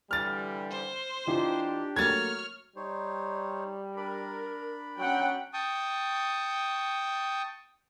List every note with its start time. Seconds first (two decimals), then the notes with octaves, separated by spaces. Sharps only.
0.11 D3 E3 G3 F6 A6
0.71 C5
1.27 E3 D4 D#4 F4 G4
1.96 F#3 A3 A#3 C#5 F6 G#6 A6
2.76 G3 D#4 C5 C#5
3.96 D4 A#4 D5 B5
4.98 F#3 C#4 F#5 G5
5.53 G5 A5 C#6 D#6